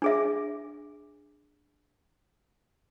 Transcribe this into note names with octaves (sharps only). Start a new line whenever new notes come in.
D4 G#4 E5